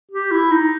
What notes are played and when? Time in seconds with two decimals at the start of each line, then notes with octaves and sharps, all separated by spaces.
0.12 G4
0.32 E4
0.52 D#4